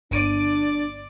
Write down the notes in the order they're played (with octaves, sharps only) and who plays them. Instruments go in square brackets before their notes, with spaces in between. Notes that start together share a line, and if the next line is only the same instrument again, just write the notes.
[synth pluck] G1 D7 D#7 [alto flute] D4 [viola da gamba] D5